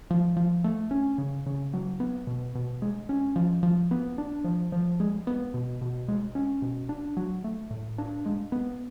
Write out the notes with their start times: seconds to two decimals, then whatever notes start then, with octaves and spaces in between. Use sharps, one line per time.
0.10 F3
0.37 F3
0.64 A3
0.91 C#4
1.18 C#3
1.46 C#3
1.74 F#3
2.00 B3
2.27 B2
2.55 B2
2.82 G#3
3.09 C#4
3.36 F3
3.63 F3
3.91 B3
4.18 D4
4.44 F3
4.72 F3
5.00 G#3
5.27 B3
5.54 B2
5.81 B2
6.08 G#3
6.35 C#4
6.62 B2
6.89 D4
7.17 F#3
7.44 A3
7.71 A2
7.98 D4
8.26 G#3
8.52 B3